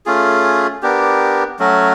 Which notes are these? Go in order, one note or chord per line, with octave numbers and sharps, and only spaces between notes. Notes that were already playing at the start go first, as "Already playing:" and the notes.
A3 C#4 F4 G#4
B3 D4 G4 A#4
F#3 A3 C#4 F#4